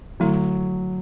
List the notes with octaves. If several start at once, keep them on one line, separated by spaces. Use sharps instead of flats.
D3 F#3 A3 E4